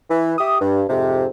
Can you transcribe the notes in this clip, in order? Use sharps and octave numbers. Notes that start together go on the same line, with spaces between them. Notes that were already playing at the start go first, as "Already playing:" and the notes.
E3
G4 E5 D#6
G2
F2 G#2 C3